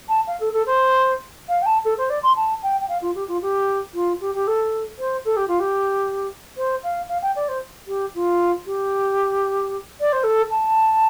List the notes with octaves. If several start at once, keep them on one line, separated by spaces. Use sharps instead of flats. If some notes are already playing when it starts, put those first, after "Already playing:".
A5
F5
A4
A4
C5
F5
G5
A5
A4
C5
D5
C6
A5
G5
G5
F5
F4
G4
F4
G4
F4
G4
G4
A4
C5
A4
G4
F4
G4
C5
F5
F5
G5
D5
C5
G4
F4
G4
D5
C5
A4
A5